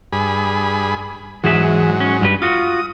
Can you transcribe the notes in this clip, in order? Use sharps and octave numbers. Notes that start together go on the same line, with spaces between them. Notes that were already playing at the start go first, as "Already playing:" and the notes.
G2 G#4 B5
G#2 E3 F#3 G#4 E5
C#4
G2 G3 B4
F4 F#4 D#6